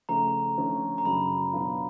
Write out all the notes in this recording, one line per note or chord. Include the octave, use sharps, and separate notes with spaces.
C#3 F3 A3 A#5
D3 F3 A3 C#4
A#5
F#2 C#3 F#3 B5
B2 F#3 B3 D4 F4